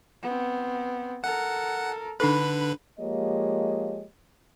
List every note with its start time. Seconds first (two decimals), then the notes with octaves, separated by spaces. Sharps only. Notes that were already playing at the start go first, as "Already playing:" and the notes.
0.22 B3 C4
1.24 A4 A#4 F#5
2.20 D3 D4 D#4 A4 B4 B5
2.99 F3 G#3 A#3 G4 C#5 D#5